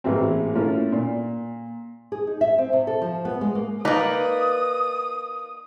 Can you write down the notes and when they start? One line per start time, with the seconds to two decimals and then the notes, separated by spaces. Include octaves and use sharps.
0.04 A1 E3 G#3 A#3 C4
0.55 A3 A#3 C#4 E4 F4
0.92 A#2
2.12 G#4
2.27 D#4
2.41 E5
2.58 C4
2.73 C3
2.87 A4
3.01 F3
3.25 B3
3.41 G#3
3.55 A#3
3.85 A#3 D#4 B4 D5 D#6